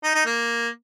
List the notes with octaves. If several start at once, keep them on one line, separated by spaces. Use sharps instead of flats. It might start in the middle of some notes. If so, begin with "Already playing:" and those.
D#4
D#4
A#3